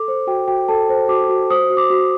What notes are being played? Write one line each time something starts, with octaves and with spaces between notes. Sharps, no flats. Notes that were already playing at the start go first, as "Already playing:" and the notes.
Already playing: A4 D6
C5
F#4 G5
F#4 G5
A4 A5
C5
F#4 D6
F#4
C5 D#6
F#4
D6
F#4